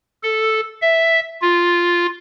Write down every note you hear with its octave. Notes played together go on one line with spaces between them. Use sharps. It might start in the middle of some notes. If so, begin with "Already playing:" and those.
A4
E5
F4